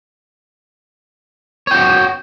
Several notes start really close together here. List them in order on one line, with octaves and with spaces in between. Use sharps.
C#5 G5 F#4